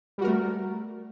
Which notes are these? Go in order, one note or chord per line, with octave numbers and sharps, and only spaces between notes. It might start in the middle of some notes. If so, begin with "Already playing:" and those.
G3 A3 F#4 A#4